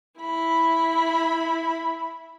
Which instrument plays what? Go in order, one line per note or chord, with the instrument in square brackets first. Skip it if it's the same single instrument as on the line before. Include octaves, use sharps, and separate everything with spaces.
[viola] E4 B5